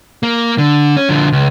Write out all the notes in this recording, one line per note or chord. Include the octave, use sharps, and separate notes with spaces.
A#3
D3
C#4
D3 F3
C#2